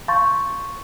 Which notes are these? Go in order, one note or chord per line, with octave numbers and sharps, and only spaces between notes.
F5 A5 C6 C#6 G6 A6